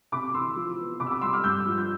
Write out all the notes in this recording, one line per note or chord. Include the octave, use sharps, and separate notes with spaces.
C3 B5 D6
E3 C6 E6
F3
B3
C3 B5 D6
E6
B5 D6
G3 C6 E6
D6 F6
G2 E6 G6
F3
G6